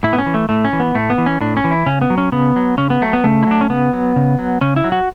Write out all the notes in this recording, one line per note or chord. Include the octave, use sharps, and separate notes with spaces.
A2 E4
B3
C#4
E3
A3
A2 A3
C#4
E3
B3
A2 A3
B3
E3
C#4
A2 D4
C#4
E3
E4
C#3 C#4
B3
F#3
C#4
C#3 B3
F#3
C#3 C#4
B3
F#3 A3
B3
C#3 A3
E4
F#3 D4
C#4
C#3 B3
F#3
C#3
F#3
C#3 C#4
E4
F#3
F#4